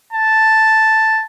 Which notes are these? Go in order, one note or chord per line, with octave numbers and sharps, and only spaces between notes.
A5